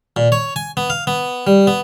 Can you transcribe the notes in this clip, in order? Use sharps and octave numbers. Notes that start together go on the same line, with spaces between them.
A#2
C#5
G#5
B3
F5
B3
G3
B3